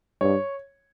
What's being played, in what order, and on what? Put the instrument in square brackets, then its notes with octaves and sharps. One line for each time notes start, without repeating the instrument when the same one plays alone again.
[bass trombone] G2 [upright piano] C#5